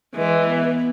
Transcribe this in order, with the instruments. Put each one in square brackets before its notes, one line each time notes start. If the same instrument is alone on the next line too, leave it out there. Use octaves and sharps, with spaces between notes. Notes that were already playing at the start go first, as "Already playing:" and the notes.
[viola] E3 [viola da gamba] G#3
[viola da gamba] B3